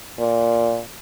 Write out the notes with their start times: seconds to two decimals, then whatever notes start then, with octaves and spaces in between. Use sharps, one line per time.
0.19 A#2